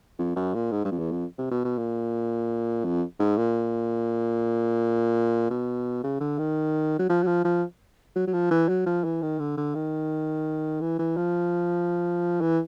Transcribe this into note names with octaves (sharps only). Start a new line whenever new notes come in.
F2
F#2
A#2
G#2
G2
F2
E2
F2
C3
B2
B2
A#2
F2
G#2
A#2
B2
C#3
D3
D#3
F#3
F3
F#3
F3
F3
F#3
F#3
F3
E3
F#3
F3
E3
D#3
D3
D3
D#3
E3
E3
F3
E3